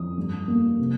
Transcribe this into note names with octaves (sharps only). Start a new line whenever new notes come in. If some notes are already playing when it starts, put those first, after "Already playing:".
Already playing: F2 D#6
G2
A#3
C3